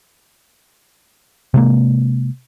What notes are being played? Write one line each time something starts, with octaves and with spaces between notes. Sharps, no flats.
C3 G#3 A#3